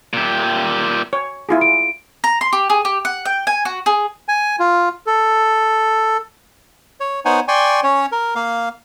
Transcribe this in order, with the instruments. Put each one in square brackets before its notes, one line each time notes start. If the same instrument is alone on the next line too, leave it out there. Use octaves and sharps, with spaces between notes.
[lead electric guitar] A#2 G4
[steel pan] C#5
E4 F4 G#4
[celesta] D7
[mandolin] A#5
C6
G4
G#4
G4
F#5
G5
G#5
F#4
G#4
[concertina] G#5
F4
A4
C#5
B3 D#4 C5 C#5 F#5 G#5
D5 G5 G#5 C6 C#6
C#4 C#5
A#4
A#3 F5